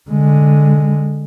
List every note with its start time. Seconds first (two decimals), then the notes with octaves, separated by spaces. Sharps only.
0.10 D3 G#3